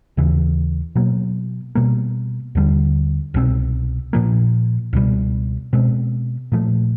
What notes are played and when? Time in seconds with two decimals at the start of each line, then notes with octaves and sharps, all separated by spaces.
0.17 D#2 C#3 E3
0.95 B2 F#3 A#3
1.75 B2 G3 A#3
2.55 D#2 D3 G3
3.34 C2 B2 G#3 C4
4.13 A#2 F3 A#3
4.93 C#2 B2 G3
5.73 B2 G#3 C4
6.52 A#2 F3 A3